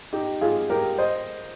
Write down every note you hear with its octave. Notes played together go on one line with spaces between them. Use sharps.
D#4 G4
F4 G#4
G4 A#4
C5 D#5